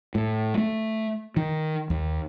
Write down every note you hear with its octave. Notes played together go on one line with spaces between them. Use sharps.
A2
A3
D#3
D#2